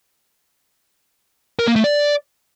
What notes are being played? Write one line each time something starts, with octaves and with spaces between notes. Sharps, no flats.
A#4
A#3
A3
D5